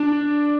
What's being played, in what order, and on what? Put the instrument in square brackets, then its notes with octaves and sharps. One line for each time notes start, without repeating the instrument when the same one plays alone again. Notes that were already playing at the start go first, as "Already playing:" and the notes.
Already playing: [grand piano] D4